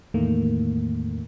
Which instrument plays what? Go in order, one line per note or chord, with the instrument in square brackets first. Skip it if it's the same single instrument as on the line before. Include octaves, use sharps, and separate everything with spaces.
[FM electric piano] E2 A2 D#3 A3 A#3